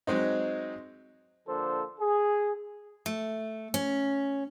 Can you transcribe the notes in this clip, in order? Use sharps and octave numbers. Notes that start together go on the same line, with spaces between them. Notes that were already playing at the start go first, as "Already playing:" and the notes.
F#3 G#3 C4 D#4
D3 F3 A#3 D4 A4 C5
G#4
A3
C#4